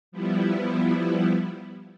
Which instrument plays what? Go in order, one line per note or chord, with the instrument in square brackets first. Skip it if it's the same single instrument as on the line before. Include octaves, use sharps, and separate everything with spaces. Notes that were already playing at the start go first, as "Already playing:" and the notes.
[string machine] F3 G3 B3 E4